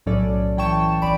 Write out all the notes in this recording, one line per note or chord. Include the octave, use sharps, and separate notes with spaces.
B1 A2 F#3 C#4 A4 D5
E3 E4 G5 A5 C#6 E7
G1 E3 D5 B5 D7